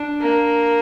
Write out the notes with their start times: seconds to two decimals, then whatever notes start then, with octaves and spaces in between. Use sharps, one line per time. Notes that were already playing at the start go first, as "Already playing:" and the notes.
Already playing: D4
0.21 A#3